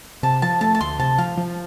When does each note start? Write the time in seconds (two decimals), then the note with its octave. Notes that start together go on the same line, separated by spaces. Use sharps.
0.23 C3 A5
0.42 F3 A5
0.61 A3 A5
0.75 A5
0.81 D2 C6
0.99 C3 A5
1.18 F3 F5
1.37 F3